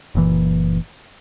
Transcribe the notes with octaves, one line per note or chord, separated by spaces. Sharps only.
F#1 A#2 E3